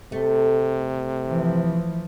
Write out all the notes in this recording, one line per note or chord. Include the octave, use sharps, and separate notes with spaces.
C3 A3
E3 F3